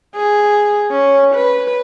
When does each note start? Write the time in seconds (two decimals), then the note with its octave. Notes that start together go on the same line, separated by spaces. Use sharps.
0.16 G#4
0.91 C#4
1.35 B4